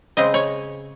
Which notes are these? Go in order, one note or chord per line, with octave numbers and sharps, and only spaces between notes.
C#3 G#3 C4 D#5
C#5